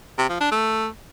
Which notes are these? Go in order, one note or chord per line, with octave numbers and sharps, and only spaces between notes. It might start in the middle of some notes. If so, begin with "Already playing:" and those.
C3
F3
D4
A3